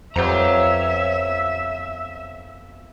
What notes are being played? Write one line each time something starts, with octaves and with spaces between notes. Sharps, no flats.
F2 F3 B3 G4 C#5 E5 A#5